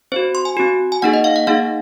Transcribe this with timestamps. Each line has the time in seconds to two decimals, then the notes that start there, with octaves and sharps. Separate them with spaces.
0.12 C4 F#4 C5
0.35 C6
0.45 G#5
0.57 C4 F#4
0.92 G#5
1.02 A#3 D#4 G#4 F#5
1.14 D#5
1.24 F5
1.36 F#5
1.47 A#3 D#4 G#4 F5